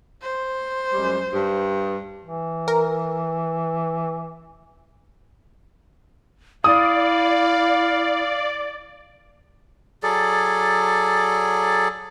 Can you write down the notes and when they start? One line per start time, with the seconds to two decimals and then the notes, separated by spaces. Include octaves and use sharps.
0.22 C5
0.93 F#2 G3 G#3
1.33 G2
2.22 E3
2.68 A#4
6.64 E4 D5 F5 D#6
10.03 F#3 G#4 A4 D5